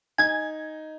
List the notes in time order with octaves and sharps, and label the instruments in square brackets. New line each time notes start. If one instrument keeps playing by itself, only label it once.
[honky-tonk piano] D#4 G#6 [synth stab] G#5